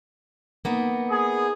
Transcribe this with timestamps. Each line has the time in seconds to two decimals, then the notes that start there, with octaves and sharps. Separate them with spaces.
0.65 A#3 B3 D#4
1.10 G#4